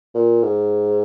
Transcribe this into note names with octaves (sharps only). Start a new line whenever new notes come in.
A#2
G#2